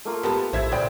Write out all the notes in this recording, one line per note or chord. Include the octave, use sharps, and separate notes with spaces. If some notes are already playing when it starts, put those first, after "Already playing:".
A3 A#3 F4
B3 G4 A#4 B4 A5
A#1 E4 C5 E5 G#6
A#2 C#3 E3 C5 D5 G5